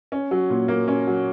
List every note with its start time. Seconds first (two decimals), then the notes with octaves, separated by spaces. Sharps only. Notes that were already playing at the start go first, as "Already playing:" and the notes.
0.12 C#4
0.31 F#3
0.50 A#2
0.68 A#3
0.88 C#4
1.07 F#3